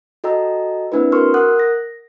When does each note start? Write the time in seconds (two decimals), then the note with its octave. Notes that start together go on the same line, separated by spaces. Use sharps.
0.24 F#4 A4 D#5 G5 A#5 E6
0.92 A#3 C4 D4 E4 B4
1.12 F#4 A#4 C6 C#6 E6 F6
1.34 A#4 F#5 D#6 F#6
1.60 A#6